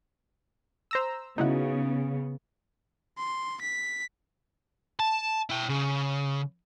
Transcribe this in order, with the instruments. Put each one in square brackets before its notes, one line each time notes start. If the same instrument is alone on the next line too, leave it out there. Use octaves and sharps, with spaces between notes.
[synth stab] C5 A#5 E6
[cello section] C#3 B3 [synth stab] D#4 E4 F#4
[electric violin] C6
B6
[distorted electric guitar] A5
E4 G5
C#3